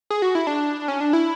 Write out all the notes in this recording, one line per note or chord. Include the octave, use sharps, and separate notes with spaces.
G#4
F#4
E4
D4
C#4
D4
E4